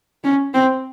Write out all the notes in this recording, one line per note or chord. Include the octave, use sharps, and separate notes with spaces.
C#4
C4